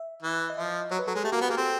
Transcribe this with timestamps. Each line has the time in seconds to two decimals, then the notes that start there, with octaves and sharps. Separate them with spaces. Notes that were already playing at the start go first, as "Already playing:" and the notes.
Already playing: E5
0.23 E3
0.50 D#5
0.57 F3 E5
0.65 D#5
0.91 F#3 C#5
0.99 B4
1.07 F#3 A4
1.15 G#3 G#4
1.24 A3 G4
1.32 A#3 F#4
1.41 B3 G4
1.50 A#3 G#4
1.57 C4 A4